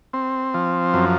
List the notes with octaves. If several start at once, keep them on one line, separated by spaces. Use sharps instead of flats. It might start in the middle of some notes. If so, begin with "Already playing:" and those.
C4
F3
F#2